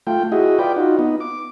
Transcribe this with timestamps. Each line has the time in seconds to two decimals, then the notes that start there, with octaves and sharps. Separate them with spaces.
0.07 A3 F4 G5
0.32 E4 F#4 G#4 D#5
0.59 F4 B4 D5 G5
0.76 D#4 F4 F#4
0.99 B3 D#4
1.20 D6